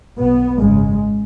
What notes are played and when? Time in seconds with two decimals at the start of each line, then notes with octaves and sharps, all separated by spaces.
0.20 B1 B2 B3
0.58 G#1 F#2 C#3 G#3